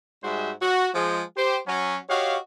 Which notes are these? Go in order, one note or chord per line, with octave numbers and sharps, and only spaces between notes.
G#2 G3 G#3 F#4 C5 E5
F#4
F3 G#3
G4 C5
F#3 C#4
F#4 G4 C#5 D#5 F5